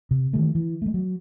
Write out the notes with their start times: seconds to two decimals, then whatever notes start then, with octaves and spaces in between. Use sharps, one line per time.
0.11 C3
0.33 D#3 E3 G3 A3
0.55 E3
0.82 G3 A3
0.94 F#3